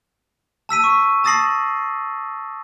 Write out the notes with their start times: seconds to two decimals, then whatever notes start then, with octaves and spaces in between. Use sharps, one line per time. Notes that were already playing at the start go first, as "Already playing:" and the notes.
0.69 A5 E6 B6 D#7
0.84 C#6
1.24 A5 D#6 A6 A#6 C7 F#7